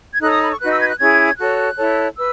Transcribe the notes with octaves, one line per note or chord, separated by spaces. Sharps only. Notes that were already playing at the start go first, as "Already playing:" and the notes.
G#6
D#4 A4 C#5 F#6
D#6
B5
C#6
D#4 F#4 B4 F#6
E6
G#6
F#6
C#4 E4 G#4 G#6
F#4 A4 C#5 F#6
E4 A4 C#5
B4 E6